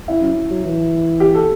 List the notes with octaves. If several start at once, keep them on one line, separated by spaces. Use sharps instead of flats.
E4
F#2
F#3
E3
G4
A4